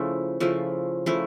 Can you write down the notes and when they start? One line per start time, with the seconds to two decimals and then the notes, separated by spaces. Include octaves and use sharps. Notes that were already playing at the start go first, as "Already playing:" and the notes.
Already playing: C#3 F3 A3 E4
0.40 C#3 F3 A3 E4
1.06 C#3 F3 A3 E4